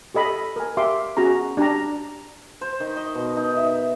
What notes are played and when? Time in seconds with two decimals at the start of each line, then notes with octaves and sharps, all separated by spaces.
0.14 G4 A4 D#5 B5
0.56 A#4 G#5
0.77 G4 E5 F5 C6 D6
1.17 C#4 F#4 G#4 A#5
1.57 D4 G4 A5 A#5
2.61 C5
2.80 D#3
2.96 D#5
3.15 B2
3.37 D#4
3.56 E5